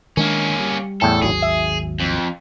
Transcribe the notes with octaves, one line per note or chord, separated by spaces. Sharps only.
D#3 G#3 A#3 C#4 D4
G3
E2 A2 A4 G5
G#1 D#2 F#3 G#4
E5
F2